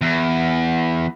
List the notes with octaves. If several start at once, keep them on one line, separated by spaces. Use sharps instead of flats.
E2